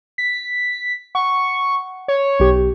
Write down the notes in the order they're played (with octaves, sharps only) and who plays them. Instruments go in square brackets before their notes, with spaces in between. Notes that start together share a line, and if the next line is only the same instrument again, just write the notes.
[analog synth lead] B6
[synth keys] F#5 [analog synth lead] C#6
[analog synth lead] C#5
[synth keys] B1 G4